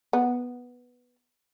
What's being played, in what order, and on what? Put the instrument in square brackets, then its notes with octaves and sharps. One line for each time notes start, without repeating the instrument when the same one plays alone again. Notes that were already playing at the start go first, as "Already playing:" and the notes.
[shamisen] B3